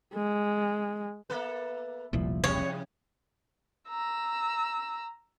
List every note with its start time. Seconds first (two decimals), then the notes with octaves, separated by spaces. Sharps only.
0.15 G#3
1.30 A#3 B3 A4 B4 E5
2.13 E1 C2 A#2 F3 E4
2.44 C3 G3 G#4 C#5
3.89 A#5 E6